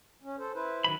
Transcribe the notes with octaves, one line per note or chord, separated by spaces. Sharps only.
C#4
A4 C5
E4 B4 C5
D#3 F#3 B5